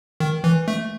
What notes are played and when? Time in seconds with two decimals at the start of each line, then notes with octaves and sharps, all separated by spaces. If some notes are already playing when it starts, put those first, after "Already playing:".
0.20 D#3
0.44 E3
0.68 A3